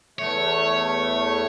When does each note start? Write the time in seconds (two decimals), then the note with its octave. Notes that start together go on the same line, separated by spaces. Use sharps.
0.19 E2 A3 C#5